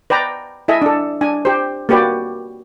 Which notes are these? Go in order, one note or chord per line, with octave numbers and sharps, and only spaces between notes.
B4 D5 G5 A#5
E4 A4 D#5 E5 G#5
D4 A4
D4 G#5
G4 C5
A#3 F#4 G4 B4 D5